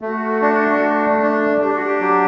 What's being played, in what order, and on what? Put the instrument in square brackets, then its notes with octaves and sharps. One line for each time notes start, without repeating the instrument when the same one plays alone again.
[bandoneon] A3 [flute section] F#4
[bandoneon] D4
A3
D4
[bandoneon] D4 [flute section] G4
[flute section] F#4
G4
[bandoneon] F#3